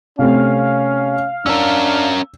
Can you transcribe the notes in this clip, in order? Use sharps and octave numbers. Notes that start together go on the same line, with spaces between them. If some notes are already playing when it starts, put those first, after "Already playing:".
C3 A3 C4 C#4 F5
C#4 D4 A#4 E6